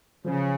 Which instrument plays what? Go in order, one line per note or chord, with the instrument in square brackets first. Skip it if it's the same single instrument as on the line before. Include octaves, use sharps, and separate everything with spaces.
[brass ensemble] C#3 [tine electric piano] F3